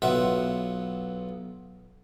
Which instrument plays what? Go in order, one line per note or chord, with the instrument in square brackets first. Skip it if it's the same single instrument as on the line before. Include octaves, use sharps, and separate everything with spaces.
[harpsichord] B1 F#3 B3 F4 E5 F#5